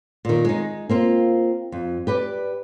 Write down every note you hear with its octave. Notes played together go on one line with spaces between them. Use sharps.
A#2 D#3
G#3 D#4
A#3 C4 F4
F2
G4 B4 D5